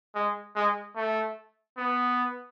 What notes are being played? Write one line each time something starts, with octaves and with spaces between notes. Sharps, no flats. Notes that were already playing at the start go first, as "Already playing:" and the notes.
G#3
G#3
A3
B3